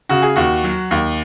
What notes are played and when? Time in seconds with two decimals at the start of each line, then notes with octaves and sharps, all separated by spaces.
0.09 C#3 F#4
0.22 G#4
0.36 D#2 F#4
0.64 F#3
0.91 D#2